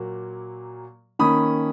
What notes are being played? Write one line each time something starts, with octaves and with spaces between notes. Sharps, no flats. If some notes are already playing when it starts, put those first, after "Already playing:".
Already playing: A#2 F#3 A#3
D#3 A#3 C#4 B5 D#6